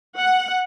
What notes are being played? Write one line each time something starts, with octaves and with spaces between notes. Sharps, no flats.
F#5